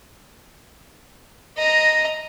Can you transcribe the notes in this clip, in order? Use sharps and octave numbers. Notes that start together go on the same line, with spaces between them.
D#5 A#5